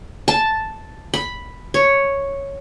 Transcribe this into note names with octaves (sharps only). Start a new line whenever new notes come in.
A5
B5
C#5